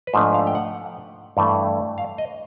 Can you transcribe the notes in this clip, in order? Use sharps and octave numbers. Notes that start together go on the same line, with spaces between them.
B4
G#2 F3 A3 D4 C5
F5
G5
F#5
G2 E3 A3
F5
D#5